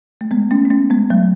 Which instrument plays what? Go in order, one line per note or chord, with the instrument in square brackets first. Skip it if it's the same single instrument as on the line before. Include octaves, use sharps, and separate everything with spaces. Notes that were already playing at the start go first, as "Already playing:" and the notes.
[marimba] A3
G#3 B3
A3 C#4
B3
A3 C#4
G#3 B3
F#3 A3